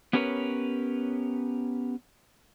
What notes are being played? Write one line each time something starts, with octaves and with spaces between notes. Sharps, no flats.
B3 C#4 G4 A#4 B4 C#5